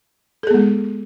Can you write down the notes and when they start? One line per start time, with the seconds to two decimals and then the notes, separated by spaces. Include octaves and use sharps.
0.43 A4
0.47 G#4
0.51 B3
0.54 G#3